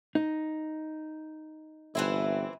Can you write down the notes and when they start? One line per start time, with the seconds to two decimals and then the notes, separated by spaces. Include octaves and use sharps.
0.15 D#4
1.95 G1 E3 C4 E4